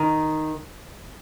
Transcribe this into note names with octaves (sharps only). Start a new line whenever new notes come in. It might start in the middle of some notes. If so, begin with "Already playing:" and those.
Already playing: D#3